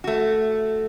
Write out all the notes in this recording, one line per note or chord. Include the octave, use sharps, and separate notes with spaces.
A3 F#4